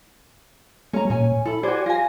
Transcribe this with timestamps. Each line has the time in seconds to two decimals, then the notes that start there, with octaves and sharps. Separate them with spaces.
0.93 G3 A3 C#4 A#5
1.10 A#2 C#4 G#5
1.45 E4 A4 B5
1.63 F#4 G4 C5 D5 G#5
1.86 F4 G#5 A#6